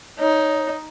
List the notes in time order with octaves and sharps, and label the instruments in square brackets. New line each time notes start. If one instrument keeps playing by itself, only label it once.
[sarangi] D#4 [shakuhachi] C#5